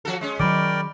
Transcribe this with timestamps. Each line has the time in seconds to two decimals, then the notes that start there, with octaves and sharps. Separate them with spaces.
0.05 F3 F#4 A4
0.21 G#3 C#4
0.40 D#3 E3 F#3 A#4 D5 G5 B5 D6